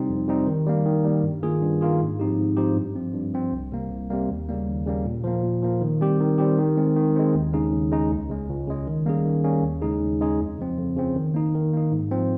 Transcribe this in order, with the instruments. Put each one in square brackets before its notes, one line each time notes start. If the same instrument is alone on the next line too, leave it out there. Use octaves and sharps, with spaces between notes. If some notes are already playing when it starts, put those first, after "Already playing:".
Already playing: [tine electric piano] C3 G3 C4 D#4
F2
C3 G3 C4 D#4
D#3
G3 A#3
D#3
G3 A#3
G2
D#3 A#3 F4 G#4
G2
D#3 A#3 F4 G#4
G#2
F3 C4 D#4 G4
G#2
F3 C4 D#4 G4
G2
F3 C4
G2
F3 C4
C2
C3 G3 A#3
C2
C3 G3 A#3
D#2
C#3 G3 A#3
D#2
C#3 G3 A#3
A#2
F3 A#3
A#2
F3 A#3
D#3
G3 C4 G4
D#3
G3 C4 G4
D#3
G#3 C4
D#3
G#3 C4
D#2
C#3 G#3 D#4
D#2
C#3 G#3 D#4
C#2
C#3 G#3
C#2
C#3 G#3
D#3
G3 A#3 C#4 G#4
D#3
G3 A#3 C#4 G#4
D#2
C#3 G#3 D#4 G#4
D#2
C#3 G#3 D#4 G#4
F2
C#3 F3 C4
F2
C#3 F3 C4
D#3
A#3 D#4
D#3
A#3 D#4
G#2
F3 C4